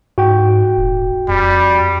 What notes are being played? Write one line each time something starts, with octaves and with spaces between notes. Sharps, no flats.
G#2 F#4 G5
D#1
F2 G3